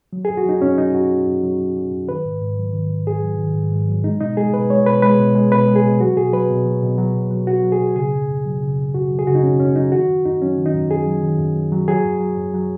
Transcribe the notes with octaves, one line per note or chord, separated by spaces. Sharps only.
F#3
G#4
F#2
F#4
F#3 D#4
F#2 C#4
F#3 D#4
F#2 F#4
F#3
F#2
F#3
F#2
F#3
F#2
D#3 B4
G#2
G#2
F#3
D#3
G#2
G#2 G#4
F#3
D#3
G#2
G#2
F#3
G#3 D#4
B2 D#4
G#3 G#4
B2 B4
G#3 C#5
B2 B4
G#3 B4
B2
G#3
B2 B4
G#3
G#4
B2
F#3 F#4
B2 G#4
F#3 B4
B2
F#3
B2
F#3
B2
F#3
B2 F#4
F#3
G#4
B2
C#3 G#4
F#2
F#2
F#3
C#3
F#2
F#2 F#4
F#3
G#4
C#3 F#4
D#4
F#2 C#4
F#2 C#4
F#3 D#4
D#3 F#4
F#2
F#2 D#4
F#3 C#4
D#3
D#4
F#2
F#2 G#4
F#3
D#3
F#2
F#2
F#3
F#3 G#4
F#2
F#3
F#2
F#3